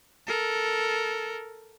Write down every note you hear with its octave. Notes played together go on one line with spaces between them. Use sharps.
A4 A#4